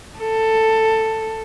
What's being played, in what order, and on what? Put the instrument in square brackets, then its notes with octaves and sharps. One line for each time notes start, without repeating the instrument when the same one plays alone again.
[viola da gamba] A4